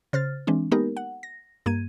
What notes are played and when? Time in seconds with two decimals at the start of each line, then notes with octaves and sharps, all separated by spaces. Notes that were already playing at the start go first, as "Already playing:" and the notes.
0.13 C#3 C5 F6 A6
0.47 E3 G#3 C4 D4
0.71 G#3 A#3 B3 D#4 G4 A#4
0.97 F#5
1.23 A#6
1.66 G2 A#3 G#6 D#7